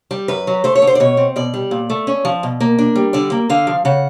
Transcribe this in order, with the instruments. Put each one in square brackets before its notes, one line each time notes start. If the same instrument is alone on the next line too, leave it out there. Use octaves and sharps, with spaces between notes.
[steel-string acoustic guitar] G3
F#2 B4
F#3
A3 C5
C#5
D3
C5
D5
B2 C#5
C4
B2 D5
G3
A#2
A3
C#4
F3
B2
A#3
D4
G3
D3 D5
A#3
D3 F5
F3
C#3 F#5